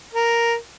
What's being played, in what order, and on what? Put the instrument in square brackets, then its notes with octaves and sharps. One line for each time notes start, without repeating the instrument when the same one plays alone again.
[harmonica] A#4